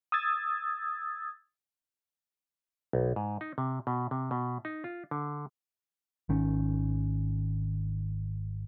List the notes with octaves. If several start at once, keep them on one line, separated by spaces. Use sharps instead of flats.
D#6 E6 G#6 A6
B1
G#2
D#4
C3
B2
C3
B2
D#4
F4
D3
G#1 D#3 C#4